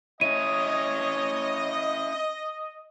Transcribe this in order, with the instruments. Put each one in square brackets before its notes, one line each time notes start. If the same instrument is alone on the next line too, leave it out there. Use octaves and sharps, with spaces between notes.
[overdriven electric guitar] C#4 E4 [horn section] C#5 [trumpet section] D#5 [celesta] D#7